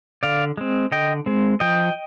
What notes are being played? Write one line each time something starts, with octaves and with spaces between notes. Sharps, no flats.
D3 D5 F5
G#3 C4
D3 D#5 G5
G#3 C4
F3 D#5 G5